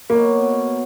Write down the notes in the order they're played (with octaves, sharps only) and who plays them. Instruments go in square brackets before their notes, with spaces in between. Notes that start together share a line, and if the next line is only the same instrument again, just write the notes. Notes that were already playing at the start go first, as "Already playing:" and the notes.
[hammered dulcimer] B2 F#3 B3 [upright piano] A#3
[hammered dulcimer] B2 F#3 B3